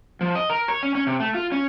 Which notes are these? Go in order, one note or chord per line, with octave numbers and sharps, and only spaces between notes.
F3
D#5
A#4
C#5
C#4
C#4
C3
A3
F4
C#4